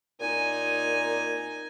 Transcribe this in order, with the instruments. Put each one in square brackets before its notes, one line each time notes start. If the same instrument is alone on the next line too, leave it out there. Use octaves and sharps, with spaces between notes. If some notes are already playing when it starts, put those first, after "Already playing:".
[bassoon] A#2 [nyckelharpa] D#4 G#5